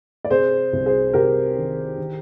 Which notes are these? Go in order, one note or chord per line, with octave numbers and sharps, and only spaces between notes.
D5
C3 G#4 C5
C2
G#4 C5
C2 G4 A#4
D#3
D#3